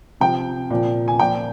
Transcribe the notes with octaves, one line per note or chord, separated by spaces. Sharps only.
C3 F3 G5
A#2 F3
G#5
A#2 F3 G5